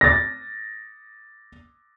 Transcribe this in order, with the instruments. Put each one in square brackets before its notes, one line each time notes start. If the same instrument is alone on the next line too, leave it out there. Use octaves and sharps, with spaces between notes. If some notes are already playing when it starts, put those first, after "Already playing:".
[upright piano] A6 A#6